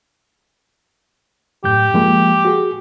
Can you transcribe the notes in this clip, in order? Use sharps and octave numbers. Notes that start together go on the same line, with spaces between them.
F#2 A2 G4 G6
F3 G#3 A#3
F#4 G#4